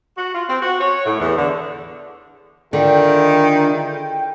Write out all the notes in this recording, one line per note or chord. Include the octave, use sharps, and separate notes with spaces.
F#4
F4
C4
F#4
C#5
A2
E2
D3
D3 D#3 G#3 E4 F4 G5